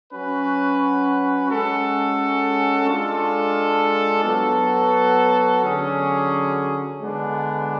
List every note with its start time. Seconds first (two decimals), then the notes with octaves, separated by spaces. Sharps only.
0.12 F#3 C#4 F#4 B4
1.49 G#3 C#4 F#4 A4
2.87 G#3 D4 F4 A4
4.24 F#3 B3 F#4 A4
5.62 D3 F#3 C#4 G#4
7.00 D3 G#3 B3 D4